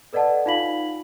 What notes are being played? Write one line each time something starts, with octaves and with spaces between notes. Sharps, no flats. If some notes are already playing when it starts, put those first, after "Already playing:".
A4 B4 D5 D#5 F#5 A5
D#4 F4 F5 B5 B6 F#7